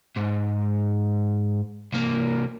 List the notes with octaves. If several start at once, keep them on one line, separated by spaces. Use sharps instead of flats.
G#2
C2 A#3